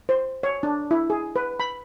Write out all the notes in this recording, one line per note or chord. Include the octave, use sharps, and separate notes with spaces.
C5
C#5
D4
E4
G#4
B4
B5